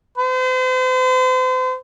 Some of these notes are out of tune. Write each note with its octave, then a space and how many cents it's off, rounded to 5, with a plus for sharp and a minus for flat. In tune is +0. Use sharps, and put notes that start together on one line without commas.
C5 -40